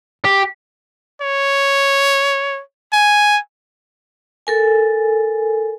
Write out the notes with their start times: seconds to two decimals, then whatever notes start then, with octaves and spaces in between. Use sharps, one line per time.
0.25 G4
1.21 C#5
2.93 G#5
4.47 A4 A#4 G#5